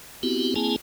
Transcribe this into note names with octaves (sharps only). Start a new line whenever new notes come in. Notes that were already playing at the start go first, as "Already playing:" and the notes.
B3 C4 E4 F#4 G4
A#3 C4 E4 G#4 G#5 A5